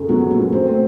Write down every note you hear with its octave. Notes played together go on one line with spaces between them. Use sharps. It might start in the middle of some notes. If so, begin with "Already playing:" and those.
Already playing: F#2 A2 C#3 A3
F#3 B3
C#3
A#3
F#3
A3 C4
C4